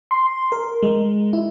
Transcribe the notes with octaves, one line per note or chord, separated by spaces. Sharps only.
C6
A#4
G#3
E4